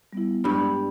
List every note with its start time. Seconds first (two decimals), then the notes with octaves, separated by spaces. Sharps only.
0.13 G3 B3 E4
0.44 G2 G3 G#3